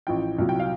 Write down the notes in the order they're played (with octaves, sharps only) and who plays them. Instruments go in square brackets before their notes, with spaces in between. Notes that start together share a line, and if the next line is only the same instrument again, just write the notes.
[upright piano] A1 A2 F3 G5
C2 A#2 F#3
G5
F5